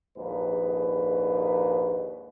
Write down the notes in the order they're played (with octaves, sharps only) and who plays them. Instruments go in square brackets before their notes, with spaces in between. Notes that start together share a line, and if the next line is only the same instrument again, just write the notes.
[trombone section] A#1 D#2 G#2 B4